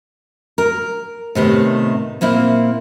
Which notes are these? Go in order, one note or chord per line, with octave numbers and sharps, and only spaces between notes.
A#4
A2 C3 D#3 B3
A#2 A#3 C4 E4